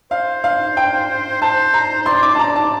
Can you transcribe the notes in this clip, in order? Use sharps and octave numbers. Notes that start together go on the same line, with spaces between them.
C5 F5
F5
G5
C5 A5
A#5
C5
D5 C6
D6
A5
A#5
A5